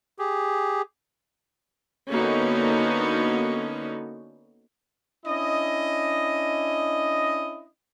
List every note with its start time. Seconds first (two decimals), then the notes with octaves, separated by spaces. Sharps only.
0.19 G4 G#4
2.11 D3 A#3 B3 C#4 D#4 F#4
5.26 C#4 D4 E4 D#5